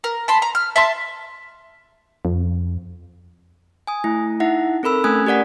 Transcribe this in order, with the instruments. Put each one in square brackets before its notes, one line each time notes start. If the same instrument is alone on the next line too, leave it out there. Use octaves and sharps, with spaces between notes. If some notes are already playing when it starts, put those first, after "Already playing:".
[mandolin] A#4
A5 B5 C6
A#5
F6
E5 A5 C6
[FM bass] F2
[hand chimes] G#5 D#6
A3 E4
D#4 E4 E5 F#5
C4 A4 A#4 B5 E6
A3 C#4 G#5 D#6 F#6 G#6
G4 A#4 D5 F#5 B6